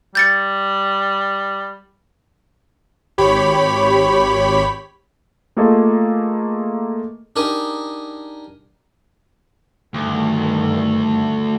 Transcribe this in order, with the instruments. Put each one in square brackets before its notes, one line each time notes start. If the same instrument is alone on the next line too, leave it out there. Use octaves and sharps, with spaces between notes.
[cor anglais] G3 [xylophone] G6 A6 C#7
[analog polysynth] G#1 G4 C#5 B5 B6
[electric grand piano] A3 A#3 F4 G#4 A4 D#5
[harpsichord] D4 D#4 G4 G#4 A#4 D#5
[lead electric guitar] D2 [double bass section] G2 D#3